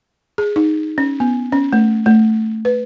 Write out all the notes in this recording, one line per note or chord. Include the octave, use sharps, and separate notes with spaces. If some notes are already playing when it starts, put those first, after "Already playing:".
G#4
D#4
C#4
B3
C#4
A3
A3
B4